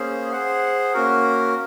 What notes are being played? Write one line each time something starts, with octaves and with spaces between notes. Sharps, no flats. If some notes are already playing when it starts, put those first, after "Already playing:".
Already playing: A#3 C#4 G#4 C5
G#4 C5 F#5
A#3 C#4 F#4 A#4